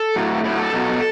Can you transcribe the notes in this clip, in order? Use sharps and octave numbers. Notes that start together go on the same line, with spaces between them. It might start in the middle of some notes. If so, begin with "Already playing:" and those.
Already playing: A4
A2 F#3
A2 F#3 E4
A4
B2 F#3